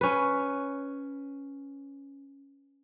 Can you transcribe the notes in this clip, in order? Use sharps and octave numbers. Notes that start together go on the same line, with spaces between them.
C#4 B4